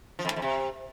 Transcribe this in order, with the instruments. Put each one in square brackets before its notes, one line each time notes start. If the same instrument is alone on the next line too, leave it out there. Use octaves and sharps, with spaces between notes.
[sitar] F3
F2
A2
F2
C3